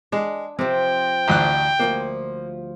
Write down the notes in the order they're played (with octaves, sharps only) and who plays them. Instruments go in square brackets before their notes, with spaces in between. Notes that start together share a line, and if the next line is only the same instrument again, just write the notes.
[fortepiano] G#3 [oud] D4
[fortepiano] C3 [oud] F3 C4 [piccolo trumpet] G5
[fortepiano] A1 D2 F#6
[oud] D2 F3 G3 [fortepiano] A#3